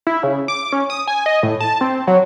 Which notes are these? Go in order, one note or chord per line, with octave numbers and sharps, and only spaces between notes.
E4
C#3
D6
C#4
D#6
G#5
D#5
A2
A5
C4
F#3